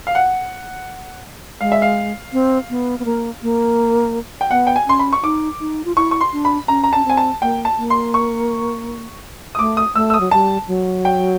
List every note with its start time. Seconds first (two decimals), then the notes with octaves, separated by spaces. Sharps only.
0.07 F5
0.15 F#5
1.61 G#3 F5
1.72 E5
1.82 F5
2.33 C4
2.70 B3
2.99 B3
3.05 A#3
3.43 A#3
4.41 G5
4.51 B3 F#5
4.67 G5
4.76 G#5
4.87 C#4 C6
4.99 B5
5.13 C#6
5.23 D#4 D6
5.60 D#4
5.85 F4
5.96 E4 C#6
6.11 C#6
6.21 C6
6.33 D4
6.45 B5
6.68 C#4 A#5
6.84 A#5
6.93 C#4 A5
7.05 C4 G#5
7.17 A5
7.42 A#3 G5
7.65 A5
7.78 A#3
7.90 C6
8.14 C#6
9.55 D#6
9.59 A3 D6
9.77 D#6
9.95 A3 E6
10.10 E6
10.14 D#6
10.20 F#3
10.31 G3 A5
10.67 F#3
11.05 G5